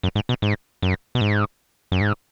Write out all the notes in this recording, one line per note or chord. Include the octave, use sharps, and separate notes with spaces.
F#2
G#2
B2
G#2
F#2
B2
G#2
F#2
G#2